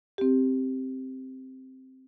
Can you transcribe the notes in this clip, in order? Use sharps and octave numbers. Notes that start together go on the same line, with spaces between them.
C4 G4